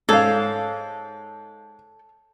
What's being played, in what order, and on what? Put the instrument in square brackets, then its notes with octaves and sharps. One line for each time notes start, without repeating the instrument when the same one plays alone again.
[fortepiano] G#2 [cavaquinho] A4 [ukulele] C#5 F5